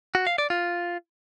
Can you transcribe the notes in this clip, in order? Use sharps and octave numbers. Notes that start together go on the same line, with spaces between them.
F#4
F5
D5
F4